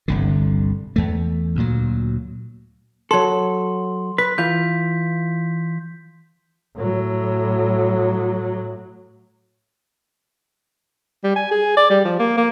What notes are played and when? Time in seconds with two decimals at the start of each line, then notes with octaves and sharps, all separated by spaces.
0.08 G1 C2 D3
0.96 E2 A3
1.55 D2 A#2 F#3
3.11 F#3 A4 C6
4.18 B4 B6
4.38 E3 F4 G6
6.76 A2 F#3
11.24 G3
11.36 G#5
11.51 G#4
11.77 D5
11.90 G3
12.04 F3
12.19 A#3
12.37 A#3